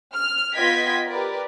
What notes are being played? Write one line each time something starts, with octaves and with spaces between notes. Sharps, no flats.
F6
B3 F4 D#5 G5 G#6 B6
G4 A#4 B4 D5